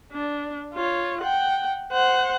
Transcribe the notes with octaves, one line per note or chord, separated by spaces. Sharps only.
D4
F4 C#5
F#5 G5
C5 F#5